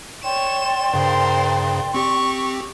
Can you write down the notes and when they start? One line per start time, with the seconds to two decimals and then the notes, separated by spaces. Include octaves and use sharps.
0.24 C#5 D5 G5 C6 E7
0.94 G2 C#3 A#4 C5
1.94 C4 G4 C#6